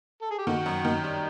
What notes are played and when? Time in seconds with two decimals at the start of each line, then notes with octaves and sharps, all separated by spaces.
0.22 A4
0.31 G#4
0.39 G4
0.47 D#3 A3 F#4
0.66 F#2
0.85 D#3
1.04 G3